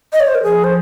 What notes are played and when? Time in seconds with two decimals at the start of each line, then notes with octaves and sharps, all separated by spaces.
0.13 D#5
0.20 C#5
0.28 C5
0.35 A#4
0.43 F3 G#4
0.64 C5